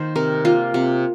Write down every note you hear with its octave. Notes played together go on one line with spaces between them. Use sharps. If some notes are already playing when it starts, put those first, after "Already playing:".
Already playing: D#3 A#3 C5
C3 A#4
A#3 F4
C3